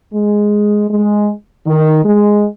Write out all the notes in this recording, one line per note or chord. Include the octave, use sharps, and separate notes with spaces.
G#3
G#3
D#3
G#3